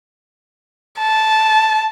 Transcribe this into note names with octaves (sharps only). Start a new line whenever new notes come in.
A5